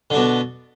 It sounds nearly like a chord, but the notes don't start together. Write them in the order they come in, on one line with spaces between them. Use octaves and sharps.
D3 D4 B2